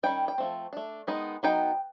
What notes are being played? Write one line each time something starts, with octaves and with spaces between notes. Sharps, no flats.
D#3 G3 C#4 G5
G5
F3 A3 C4
A3 D4
D#3 G#3 B3 D#4
F#3 B3 D#4 G5